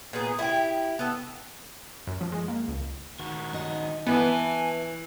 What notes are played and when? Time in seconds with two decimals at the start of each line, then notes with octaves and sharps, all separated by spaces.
0.13 A#2 B3 G#4
0.39 E4 F#4 G4
0.99 B3 A4
2.07 F#2
2.21 F3
2.32 G#3
2.48 A#3
2.68 C#2
3.20 D#3 F#4
3.53 D#4 D#5
4.07 E3 B3 B4 E5 G#5 A5